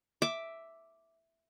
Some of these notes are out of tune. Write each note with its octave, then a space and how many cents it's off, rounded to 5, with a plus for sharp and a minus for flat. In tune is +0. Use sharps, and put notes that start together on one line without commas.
E5 +0 D6 +0